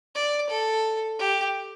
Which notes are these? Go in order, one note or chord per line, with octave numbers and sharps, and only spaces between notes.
D5
A4
G4